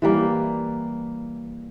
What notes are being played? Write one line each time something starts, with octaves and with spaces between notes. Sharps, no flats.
E3 G3 A#3